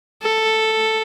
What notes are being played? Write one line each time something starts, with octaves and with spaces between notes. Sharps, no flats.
A4